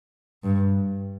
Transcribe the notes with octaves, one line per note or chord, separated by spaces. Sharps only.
G2